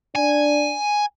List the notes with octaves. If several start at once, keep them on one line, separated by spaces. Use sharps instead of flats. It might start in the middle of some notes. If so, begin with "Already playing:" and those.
D4 G#5